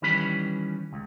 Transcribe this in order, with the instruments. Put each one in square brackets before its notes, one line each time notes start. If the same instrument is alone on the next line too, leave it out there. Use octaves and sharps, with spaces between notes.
[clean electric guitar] D#3 E3 G3 C#4 B4 B5
C#2